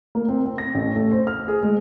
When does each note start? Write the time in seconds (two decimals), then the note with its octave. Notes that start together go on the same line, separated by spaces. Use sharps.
0.15 A#3
0.29 C4
0.46 C4
0.58 A#6
0.75 A1
0.95 A3
1.11 C5
1.27 F6
1.48 G#4
1.63 G#3